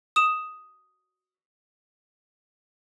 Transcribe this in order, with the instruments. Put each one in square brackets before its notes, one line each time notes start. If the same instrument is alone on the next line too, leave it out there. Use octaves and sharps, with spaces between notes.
[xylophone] D#6 E7